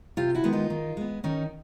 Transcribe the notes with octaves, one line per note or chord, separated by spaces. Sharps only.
C3 F4 G4
E4 F#4
D#3 G#3 B3
D#4 F4
D#3
G#3 B3
D#3 C#4 D#4